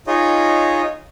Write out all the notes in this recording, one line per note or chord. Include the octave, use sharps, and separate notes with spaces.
D#4 F4 G#4 C#5 D#5